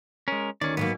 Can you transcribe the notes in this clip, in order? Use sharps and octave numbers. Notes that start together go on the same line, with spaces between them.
G#3 C#4 A#4
D2 D#3 C#4 D5
G#2 F#3 A#3 B3